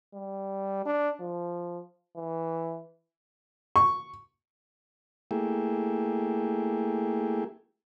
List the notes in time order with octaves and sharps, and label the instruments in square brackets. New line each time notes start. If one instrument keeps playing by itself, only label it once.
[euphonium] G3
D4
F3
E3
[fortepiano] C#6
[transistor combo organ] A3 A#3 E4 G4 G#4